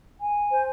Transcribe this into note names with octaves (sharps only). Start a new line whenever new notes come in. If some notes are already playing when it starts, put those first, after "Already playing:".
G#5
C5